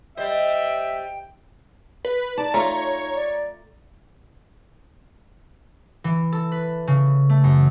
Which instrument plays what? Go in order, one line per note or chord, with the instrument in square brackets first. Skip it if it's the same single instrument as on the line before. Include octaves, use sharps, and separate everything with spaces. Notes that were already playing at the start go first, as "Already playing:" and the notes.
[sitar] G3 C5 [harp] D#5 [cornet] E5 [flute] G5
[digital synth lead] B4
[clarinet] D#4 [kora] D5 [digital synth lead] A5
[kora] A3 F4 [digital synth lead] C#5 [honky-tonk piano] A#5
[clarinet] D5
[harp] E3
A4
B4
C#3
A3
F#2